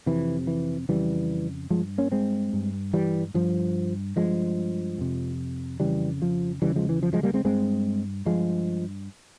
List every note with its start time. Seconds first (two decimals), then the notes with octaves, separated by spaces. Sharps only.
0.06 F2 C3 E3
0.47 E3
0.89 F2 C#3 E3 G3
1.70 G2 F3 G#3
1.98 A#3 C#4
2.12 G#3 C4
2.53 G2
2.93 E3 G3
3.34 G2 F3
4.16 G2 F3 G#3
4.98 F2 C3
5.80 F2 C#3 E3 G3
6.22 F3
6.62 E2 C#3 E3 G3
6.76 F3 G#3
6.89 E3
7.03 F3
7.13 F3 G#3
7.23 G3 A#3
7.34 G#3 C4
7.44 G2 G#3 C4
8.25 G2 F3 G#3